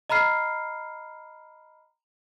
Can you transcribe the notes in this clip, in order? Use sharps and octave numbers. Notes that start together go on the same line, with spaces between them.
D#5 A#5 B5 F6 C7